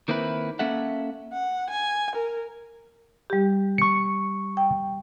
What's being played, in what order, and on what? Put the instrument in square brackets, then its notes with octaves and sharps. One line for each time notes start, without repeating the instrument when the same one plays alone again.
[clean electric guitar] D#3 A#3 C4 E4 B4
A#3 C#4 A4 E5 F#5
[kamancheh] F#5
G#5
A#4
[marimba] G3 G4
[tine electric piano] C#6 C#7
[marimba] G5